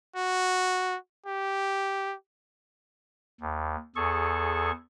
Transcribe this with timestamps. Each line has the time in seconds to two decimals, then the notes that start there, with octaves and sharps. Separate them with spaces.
0.16 F#4
1.26 G4
3.40 D#2
3.96 E2 G#4 A4 C#6